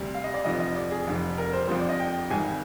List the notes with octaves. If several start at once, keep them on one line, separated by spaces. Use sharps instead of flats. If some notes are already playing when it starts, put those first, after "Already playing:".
Already playing: D2 C3 G3
F5
D#5
D5
F1 F2 D3 F3 D#5
D#5
D5
G#4
F1 F2 D3
A#4
C5
F2 D3 F3 C5
D5
D#5
G5
G#1 G2 D#3 G3 G#5